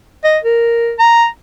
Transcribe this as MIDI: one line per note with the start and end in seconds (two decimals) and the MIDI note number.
0.24 0.39 75
0.44 0.94 70
0.99 1.26 82